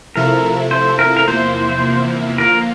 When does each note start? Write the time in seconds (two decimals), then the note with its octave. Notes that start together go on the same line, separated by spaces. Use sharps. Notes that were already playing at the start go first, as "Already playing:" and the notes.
0.16 C3 F3 A3 E4 A4 A#4
0.71 C5
0.99 A#4
1.17 A#4
1.28 E2 C3 F3 A#3 E4 C5
2.38 D3 F3 A#3 F4 A#4